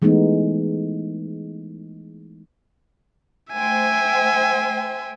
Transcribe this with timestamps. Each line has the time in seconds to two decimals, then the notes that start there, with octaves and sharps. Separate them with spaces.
0.02 E3 G#3 A3 B3 D#4
3.53 A3 C5 E5 G5 G#5